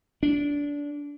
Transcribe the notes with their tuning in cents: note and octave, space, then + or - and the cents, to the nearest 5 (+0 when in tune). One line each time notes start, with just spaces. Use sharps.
D4 -20